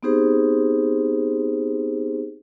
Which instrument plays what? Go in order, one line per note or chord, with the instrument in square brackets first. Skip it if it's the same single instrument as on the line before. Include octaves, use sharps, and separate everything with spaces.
[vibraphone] B3 C4 D#4 G4 G#4 C5